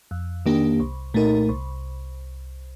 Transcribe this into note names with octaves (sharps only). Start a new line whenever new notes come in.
F2
D#3 A#3 D4 G4
C2
A#2 A3 D#4 A#4
C2